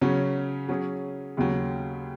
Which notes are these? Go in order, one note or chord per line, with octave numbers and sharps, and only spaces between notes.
C#3 F#3 C#4
F#3 C#4 G#4
D#2 C#3 F#3